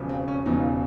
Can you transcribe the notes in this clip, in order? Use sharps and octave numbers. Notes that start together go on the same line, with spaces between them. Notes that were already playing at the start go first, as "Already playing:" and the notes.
Already playing: E1 E2 C#3 F3
C4
C#4
E1 E2 C#3 F3 D#4